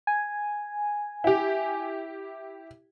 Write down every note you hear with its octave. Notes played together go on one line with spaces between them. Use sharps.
G#5
E4 G4